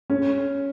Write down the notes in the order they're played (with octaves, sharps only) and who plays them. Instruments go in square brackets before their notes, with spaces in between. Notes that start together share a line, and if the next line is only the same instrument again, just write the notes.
[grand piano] C#4